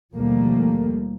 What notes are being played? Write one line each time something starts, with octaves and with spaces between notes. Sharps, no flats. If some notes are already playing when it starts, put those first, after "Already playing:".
D#2 B2 F3 G3 A3 A#3